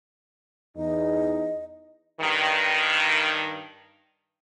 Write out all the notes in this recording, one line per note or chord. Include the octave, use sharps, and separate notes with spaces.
E2 D#4 D#5
G2 D#3